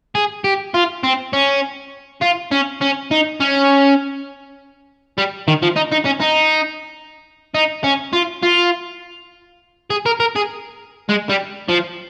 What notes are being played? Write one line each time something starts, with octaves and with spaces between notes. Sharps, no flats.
G#4
G4
F4
C4
C#4
F4
C#4
C#4
D#4
C#4
G3
D#3
F3
D#4
D#4
C#4
D#4
D#4
C#4
F4
F4
G#4
A#4
A#4
G#4
G#3
G3
F3